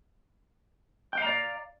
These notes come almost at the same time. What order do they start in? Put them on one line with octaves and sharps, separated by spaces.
G5 F5 A#5 D5